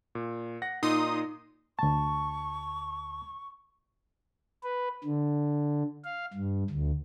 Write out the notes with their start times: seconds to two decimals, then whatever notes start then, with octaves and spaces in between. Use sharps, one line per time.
0.15 A#2
0.62 F#5 A#6
0.83 A#2 D#4 C6 D#6
1.79 D2 A5 C#6
4.64 B4
5.04 D3
6.04 F5
6.34 G2
6.70 D2